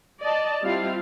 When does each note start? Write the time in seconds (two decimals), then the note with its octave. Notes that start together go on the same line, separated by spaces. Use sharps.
0.20 D5 D#5 A5
0.63 G3 C4 E4 F4 F5